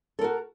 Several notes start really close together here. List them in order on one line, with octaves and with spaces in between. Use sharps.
A4 A#4 F#4